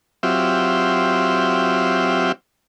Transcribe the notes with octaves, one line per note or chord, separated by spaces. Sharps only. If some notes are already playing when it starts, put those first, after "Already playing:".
F#3 C4 F4 G4 E5